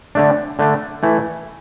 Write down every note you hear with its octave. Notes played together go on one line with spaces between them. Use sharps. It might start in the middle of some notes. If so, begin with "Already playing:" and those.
D3 A3 D4
D3 A3 D4
E3 A3 E4